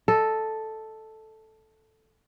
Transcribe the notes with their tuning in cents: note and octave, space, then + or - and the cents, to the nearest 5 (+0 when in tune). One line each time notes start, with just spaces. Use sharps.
A4 +0 D#5 +0